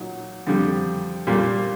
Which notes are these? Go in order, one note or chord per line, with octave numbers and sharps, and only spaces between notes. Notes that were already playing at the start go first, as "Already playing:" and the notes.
Already playing: A#2 F#3 D#4
F2 D3 G3
A#2 G3 A#3